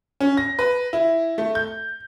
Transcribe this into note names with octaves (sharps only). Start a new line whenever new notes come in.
C#4
A#6
B4
E4
A3
G6